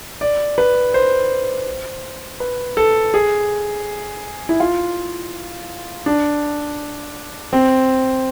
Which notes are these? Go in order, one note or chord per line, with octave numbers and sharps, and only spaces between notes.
D5
B4
C5
B4
A4
G#4
E4
F4
D4
C4